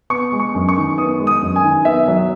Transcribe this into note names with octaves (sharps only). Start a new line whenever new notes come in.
B3 C#6
G#3
C#6
F#2
C#6
D#3
B3 D#6
G#3
D#6
F#2
G#5
D#3
B3 E5
F#3